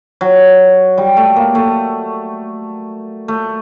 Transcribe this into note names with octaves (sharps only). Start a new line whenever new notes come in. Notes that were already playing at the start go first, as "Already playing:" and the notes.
F#3
G3
A3
A#3
A3
A3